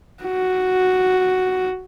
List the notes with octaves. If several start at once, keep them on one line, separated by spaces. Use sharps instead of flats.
F#4